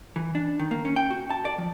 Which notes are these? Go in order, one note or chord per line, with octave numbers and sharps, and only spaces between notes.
E3
D4
D#3
A#3
C#4
G5
F#4
A5
D5
F3